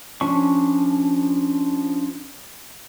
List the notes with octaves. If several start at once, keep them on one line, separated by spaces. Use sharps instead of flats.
F3 C#4 D4 C#6